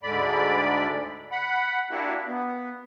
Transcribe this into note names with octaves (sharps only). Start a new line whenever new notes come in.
D2 G#2 D3 D5 B5
F#5 B5
A#3 D4 E4 F#4 G4
B3